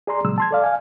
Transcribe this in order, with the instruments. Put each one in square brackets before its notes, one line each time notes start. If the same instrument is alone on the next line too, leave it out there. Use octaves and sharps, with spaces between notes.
[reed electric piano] G#4 D5 A#5 C6
A#2 C#3 F#3 G#3 E6
A5 C6 G#6
A4 D5 F5
F5 G#5